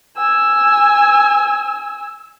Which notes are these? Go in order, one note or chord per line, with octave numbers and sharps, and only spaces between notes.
G#5 E6